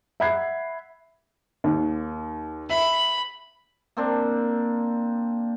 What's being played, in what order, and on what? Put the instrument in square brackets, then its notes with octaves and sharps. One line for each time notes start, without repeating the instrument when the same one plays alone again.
[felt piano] E5 F#5 B5 F#6 G#6 C7
[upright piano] D#2
[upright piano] E5 [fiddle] B5
[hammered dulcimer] A#3 C4 D4